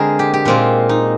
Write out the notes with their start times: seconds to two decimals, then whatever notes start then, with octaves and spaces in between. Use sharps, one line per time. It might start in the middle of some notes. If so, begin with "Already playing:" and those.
Already playing: D3 G#3 C4 G#4 A#4 C5
0.19 G4
0.34 G4
0.45 A#2 G#3 C4 F4
0.89 D#4